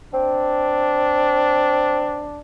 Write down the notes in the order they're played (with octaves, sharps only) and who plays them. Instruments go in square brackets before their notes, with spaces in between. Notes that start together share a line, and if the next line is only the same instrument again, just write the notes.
[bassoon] C4 [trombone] D4